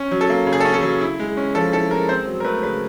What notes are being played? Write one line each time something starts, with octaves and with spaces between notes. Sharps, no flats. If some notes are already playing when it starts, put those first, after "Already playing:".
Already playing: C#4
F#3
A4
A#3
C#3
G#4
A4
C#4
A4
F#3
E4
G#3
C#4
F3 A4
E4 A4
G#3 A#4
C4 C5
F#3
A#4
A3 B4
C#3 B4